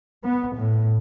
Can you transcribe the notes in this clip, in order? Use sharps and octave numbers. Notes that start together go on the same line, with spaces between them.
B3
A2